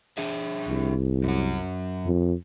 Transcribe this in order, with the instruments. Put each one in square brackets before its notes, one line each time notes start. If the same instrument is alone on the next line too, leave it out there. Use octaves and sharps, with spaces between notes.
[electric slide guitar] D4 G#4 E5
[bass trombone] C2
[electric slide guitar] F#2 F#4
[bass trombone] F2